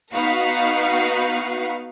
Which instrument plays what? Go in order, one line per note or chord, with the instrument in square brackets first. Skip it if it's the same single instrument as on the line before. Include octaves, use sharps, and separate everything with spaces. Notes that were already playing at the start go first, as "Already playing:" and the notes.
[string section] B3 D#4 F#4 B4 F5 F#5